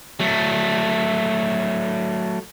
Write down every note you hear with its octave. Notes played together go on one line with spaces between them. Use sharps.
F#3 A3